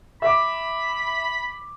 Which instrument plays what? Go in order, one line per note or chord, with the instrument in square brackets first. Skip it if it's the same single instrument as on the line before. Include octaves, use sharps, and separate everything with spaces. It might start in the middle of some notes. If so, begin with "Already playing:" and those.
[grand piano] E5 D6 [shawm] B5